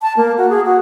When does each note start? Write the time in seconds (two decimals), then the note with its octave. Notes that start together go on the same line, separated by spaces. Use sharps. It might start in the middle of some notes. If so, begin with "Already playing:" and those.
0.02 A5
0.17 A#3
0.37 F#4
0.49 G#4
0.65 F#4